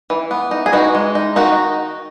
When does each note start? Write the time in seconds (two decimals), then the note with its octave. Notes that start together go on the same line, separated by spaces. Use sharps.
0.10 E3
0.31 B3
0.51 D#4
0.66 G#4
0.72 E3 D#4 F#4
0.95 G#3
1.15 D#4
1.36 D#3 D#4 F#4